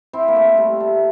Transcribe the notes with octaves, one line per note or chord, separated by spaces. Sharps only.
C4 E4
A#3
A3
G3
A3